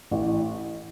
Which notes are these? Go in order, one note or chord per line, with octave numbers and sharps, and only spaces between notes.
A1